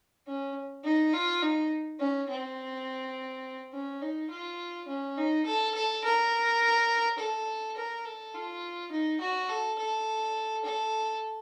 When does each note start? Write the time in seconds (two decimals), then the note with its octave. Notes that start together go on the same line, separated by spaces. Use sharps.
0.27 C#4
0.84 D#4
1.13 F4
1.42 D#4
1.99 C#4
2.29 C4
3.73 C#4
4.02 D#4
4.30 F4
4.88 C#4
5.17 D#4
5.45 A4
5.74 A4
6.04 A#4
7.18 A4
7.76 A#4
8.05 A4
8.34 F4
8.91 D#4
9.20 F#4
9.49 A4
9.78 A4
10.65 A4